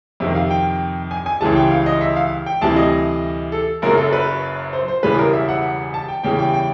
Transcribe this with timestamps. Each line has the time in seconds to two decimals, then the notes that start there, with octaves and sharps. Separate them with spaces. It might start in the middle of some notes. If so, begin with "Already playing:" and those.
0.20 F2 C3 D#3 E5
0.35 F5
0.50 G5
1.11 G#5
1.26 G#5
1.41 C#2 C#3 E3 G3 A5
1.56 G5
1.71 F5
1.86 D#5
2.01 E5
2.16 F5
2.46 G5
2.61 D2 C3 E3 G3 A5
2.76 D#5
3.52 A4
3.82 F#1 F#2 C#3 F#3 A#4
3.98 A4
4.13 B4
4.73 C5
4.88 C5
5.03 E1 E2 C#3 E3 G3 B4
5.18 A#4
5.33 E5
5.49 F#5
5.94 A5
6.08 G5
6.24 E2 C#3 E3 G3 G5
6.39 G5
6.54 G5